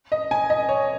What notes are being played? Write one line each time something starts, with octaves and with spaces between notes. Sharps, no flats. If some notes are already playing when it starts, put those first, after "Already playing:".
D#5
G#5
D#5
C#5